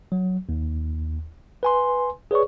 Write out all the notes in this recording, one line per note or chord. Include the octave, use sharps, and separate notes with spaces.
F#3
D#2
B4 G#5 C6
G#4 B4 C#5 D5 C#6